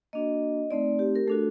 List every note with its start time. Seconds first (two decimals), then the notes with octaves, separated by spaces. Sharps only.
0.13 A#3 D4 F#4 D#5
0.71 A3 C4 D#4 D5
0.99 G4
1.16 A#4
1.27 A3 D4 F#4 A4